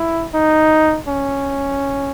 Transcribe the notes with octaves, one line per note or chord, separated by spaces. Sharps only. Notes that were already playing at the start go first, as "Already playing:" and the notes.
Already playing: E4
D#4
C#4